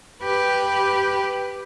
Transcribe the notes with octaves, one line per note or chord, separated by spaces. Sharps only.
G4 B4